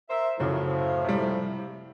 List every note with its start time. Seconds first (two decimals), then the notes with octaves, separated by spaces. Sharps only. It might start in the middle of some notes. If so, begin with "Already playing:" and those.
0.10 A#4 C5 E5
0.40 F#2 A2 C#3 F3 F#3
1.05 C3 G3